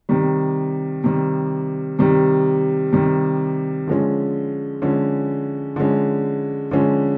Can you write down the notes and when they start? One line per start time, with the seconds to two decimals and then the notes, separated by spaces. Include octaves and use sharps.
0.09 C3 D#3 G3
1.04 C3 D#3 G3
1.99 C3 D#3 G3
2.93 C3 D#3 G3
3.87 D3 F3 G#3 C#4
4.82 D3 F3 G#3 C#4
5.76 D3 F3 G#3 C#4
6.71 D3 F3 G#3 C#4